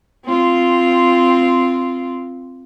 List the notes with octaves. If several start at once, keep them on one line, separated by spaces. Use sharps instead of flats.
C4 F4